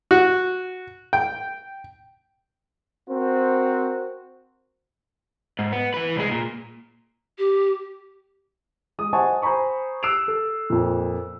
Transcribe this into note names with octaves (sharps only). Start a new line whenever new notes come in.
F#4
G5
C4 F#4 A#4 C5
G#2
B3
E3 B4
C2 G#3
A#2
G4
G#3 D#6
C5 D#5 F#5 G#5 A5 C#6
C5 G#5 A#5 B5 C#6
E6 F#6 C7 D7 E7 F7
A4
F2 A#2